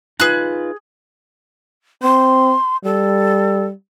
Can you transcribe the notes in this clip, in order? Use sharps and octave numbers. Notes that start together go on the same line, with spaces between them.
D#4 F4 G#4 B4 F#6
C4 C6
G3 A4